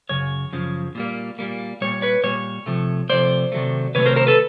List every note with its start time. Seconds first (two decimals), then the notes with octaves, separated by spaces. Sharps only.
0.09 F#2 C#3 C#5
0.53 F#2 C#3 F3
0.95 A#2 G3 A#3
1.39 A#2 G3 A#3
1.81 A#2 G3 C#5
2.02 B4 C#5
2.23 A#2 G3 C#5
2.66 C3 F3 A3
3.09 C3 F3 A3 C5 D5
3.52 C3 D#3 F#3 A3
3.95 C3 D#3 F#3 A3 B4 C#5
4.06 A#4 C5
4.16 A#4 C5
4.27 A4 B4